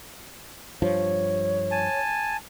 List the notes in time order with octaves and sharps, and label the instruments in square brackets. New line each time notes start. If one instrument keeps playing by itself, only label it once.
[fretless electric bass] G2 F3 [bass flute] C#5
[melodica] G#5 A5